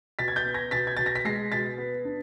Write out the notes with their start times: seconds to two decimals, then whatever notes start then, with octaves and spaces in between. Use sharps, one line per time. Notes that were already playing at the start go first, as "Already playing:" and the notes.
0.19 B2 A6 B6
0.28 G#6
0.36 G6 A6
0.46 B3
0.54 G#6 A#6
0.71 B2 A6 B6
0.87 G#6
0.97 B2 A6
1.06 A#6
1.15 B6
1.25 G#3 A#6 C7
1.52 B2 A6 B6
1.78 B3
2.05 D4